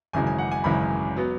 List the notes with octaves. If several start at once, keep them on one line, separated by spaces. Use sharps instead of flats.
G#1 F#2 C#3 E3 G#3 G#5
G#5
F#5
G#5
G#1 F#2 C#3 E3 G#3 B5
F#3 B3